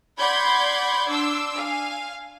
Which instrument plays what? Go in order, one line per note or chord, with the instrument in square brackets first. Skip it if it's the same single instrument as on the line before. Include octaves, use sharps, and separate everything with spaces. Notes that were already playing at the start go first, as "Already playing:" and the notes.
[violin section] D5 F#5 B5 C6 G6 G#6
D4 C6 D6 E6
F5 G#5